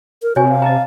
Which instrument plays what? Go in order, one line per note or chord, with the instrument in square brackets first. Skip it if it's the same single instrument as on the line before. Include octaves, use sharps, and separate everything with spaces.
[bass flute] A#4
[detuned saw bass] C3 [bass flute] F#4 [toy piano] C#5 G#5
[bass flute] F5
[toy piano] D#5 A5 A#5